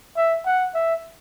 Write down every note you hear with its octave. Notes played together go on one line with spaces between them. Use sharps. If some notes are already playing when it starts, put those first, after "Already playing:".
E5
F#5
E5